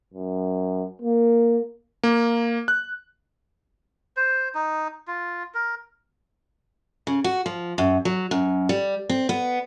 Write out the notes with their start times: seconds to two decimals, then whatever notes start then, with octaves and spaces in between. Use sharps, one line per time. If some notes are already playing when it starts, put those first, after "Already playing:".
0.14 F#2
1.02 A#3
2.03 A#3
2.68 F#6
4.17 C5
4.55 D#4
5.08 F4
5.54 A#4
7.07 C#3
7.24 F#4
7.46 F3
7.78 F#2
8.05 F#3
8.31 F#2
8.69 G3
9.09 C4
9.29 B3